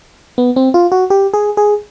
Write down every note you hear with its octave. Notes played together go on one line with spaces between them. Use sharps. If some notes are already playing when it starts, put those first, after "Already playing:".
B3
C4
F4
F#4
G4
G#4
G#4